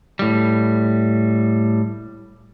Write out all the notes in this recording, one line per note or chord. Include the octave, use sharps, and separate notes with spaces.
A2 G3